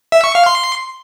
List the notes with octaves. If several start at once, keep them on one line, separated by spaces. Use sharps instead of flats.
E5
C#6
F5
C6